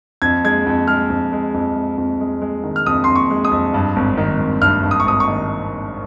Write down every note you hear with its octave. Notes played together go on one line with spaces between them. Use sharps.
F2 G#6
G#3 G#6
F2
G#3 F6
F2
G#3
F2
G#3
F2
G#3
G#3
D#3
F6
F2 D#6
F2 C6
C#6
G#3
D#6
F2
G2
G#1
D#3
G#1
G2 F6
G2
D#6
C#6
G#1 D#6
C#6
D#3